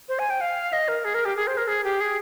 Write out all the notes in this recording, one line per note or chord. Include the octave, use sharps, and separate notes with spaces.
C5
G#5
G5
F5
D#5
A#4
G#4
A#4
G4
G#4
C5
A#4
G#4
G4
G#4